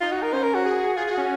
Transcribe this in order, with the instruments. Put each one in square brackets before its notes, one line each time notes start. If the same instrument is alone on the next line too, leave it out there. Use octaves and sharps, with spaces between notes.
[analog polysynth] D#4 [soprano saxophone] F4
[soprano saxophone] F#4
A#4
[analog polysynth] C#4 [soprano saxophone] C5
[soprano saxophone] A#4
F#4
[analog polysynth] G#4
[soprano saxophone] F4 [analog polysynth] G#4
[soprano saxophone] F#4 [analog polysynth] G#4
[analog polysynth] C#4